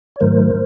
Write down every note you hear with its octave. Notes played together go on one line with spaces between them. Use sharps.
C#5
G#2 D#3 F#3 A3 A#4 C5